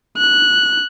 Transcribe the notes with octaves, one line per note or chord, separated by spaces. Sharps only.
F#6